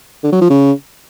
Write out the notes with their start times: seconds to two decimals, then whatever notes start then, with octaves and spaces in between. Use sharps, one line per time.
0.23 D3
0.32 F#3
0.41 F3
0.50 C#3